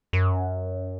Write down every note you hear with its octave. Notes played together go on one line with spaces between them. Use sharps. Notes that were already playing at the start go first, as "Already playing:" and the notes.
F#2